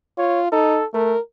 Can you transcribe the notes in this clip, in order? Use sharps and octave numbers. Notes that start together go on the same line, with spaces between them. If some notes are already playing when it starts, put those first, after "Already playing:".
F4 C#5
D#4 A4
A3 A#4